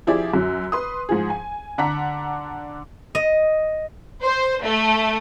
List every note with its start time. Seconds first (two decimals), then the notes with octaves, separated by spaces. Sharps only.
0.07 F3 E4 G4 G#4 D5
0.34 F#2 F#3
0.72 B4 C6 D#6
1.09 G#2 F3 G#4
1.30 G#5
1.78 D3 D4 F#5 A#5 B6
3.15 D#5
4.23 C5
4.63 A3